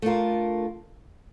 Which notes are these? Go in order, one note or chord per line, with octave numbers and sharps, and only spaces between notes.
A3 D4 F4 A#4